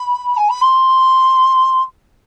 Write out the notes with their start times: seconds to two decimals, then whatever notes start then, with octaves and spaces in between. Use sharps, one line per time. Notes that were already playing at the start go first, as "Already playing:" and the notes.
Already playing: B5
0.37 G#5
0.49 B5
0.61 C6